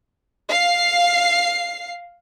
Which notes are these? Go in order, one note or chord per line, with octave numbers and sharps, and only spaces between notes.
F5 C7